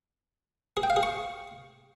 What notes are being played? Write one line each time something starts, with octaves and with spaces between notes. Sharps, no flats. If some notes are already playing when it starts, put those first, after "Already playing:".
G#4
G5
F5
G#4
C#6